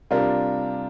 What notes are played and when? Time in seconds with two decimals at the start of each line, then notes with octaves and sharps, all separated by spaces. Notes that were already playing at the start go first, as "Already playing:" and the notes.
0.11 C3 G3 D4 F4 A#4